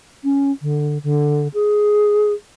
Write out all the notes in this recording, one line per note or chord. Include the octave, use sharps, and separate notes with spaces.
C#4
D3
D3
G#4